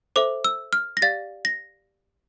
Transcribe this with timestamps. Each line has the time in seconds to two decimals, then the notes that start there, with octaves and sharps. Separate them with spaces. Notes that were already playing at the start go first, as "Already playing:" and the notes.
0.16 A4 C5 E5 D6
0.45 E6
0.73 F6
0.97 A#6
1.02 G4 D5 F5 A6
1.45 A#6